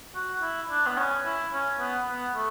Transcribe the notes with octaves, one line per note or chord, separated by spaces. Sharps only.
F#4
E4
D4
B3
C#4
E4
C#4
B3
B3
A3